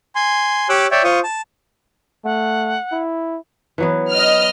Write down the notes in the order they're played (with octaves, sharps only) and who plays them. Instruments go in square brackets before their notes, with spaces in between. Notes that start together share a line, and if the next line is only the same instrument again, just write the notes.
[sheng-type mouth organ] G#5 C6
G4 C#5 D6 E6 F#6
C#5 D5 E5 G5
F4 C5 C#6 D#6
A5
[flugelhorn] A3 [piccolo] F#5
[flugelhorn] E4
[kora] E3 F#3 B3
[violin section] D#5 F6